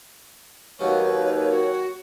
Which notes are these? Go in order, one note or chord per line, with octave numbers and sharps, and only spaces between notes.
D#2 F#3 C#4 B4 C#5
F#4